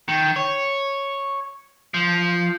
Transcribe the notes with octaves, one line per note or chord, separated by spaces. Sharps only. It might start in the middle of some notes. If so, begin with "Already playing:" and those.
D#3
C#5
F3